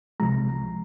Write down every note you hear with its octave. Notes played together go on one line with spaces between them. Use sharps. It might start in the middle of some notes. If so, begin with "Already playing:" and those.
C2 C3 F3 G#3 A#5